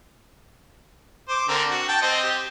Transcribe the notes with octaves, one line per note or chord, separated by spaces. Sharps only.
C5 D6
D3 C4 A#4
F#4
G5 A5
C4 C5 D#5
G4